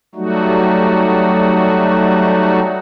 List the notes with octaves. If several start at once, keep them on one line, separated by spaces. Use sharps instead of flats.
F#3 G3 A3 D#4 F#4